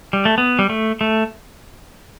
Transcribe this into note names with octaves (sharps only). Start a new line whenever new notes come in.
G3
A3
B3
G3
A3
A3